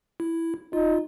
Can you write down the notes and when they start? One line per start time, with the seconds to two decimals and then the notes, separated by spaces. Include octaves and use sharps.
0.20 E4
0.73 D#4 F4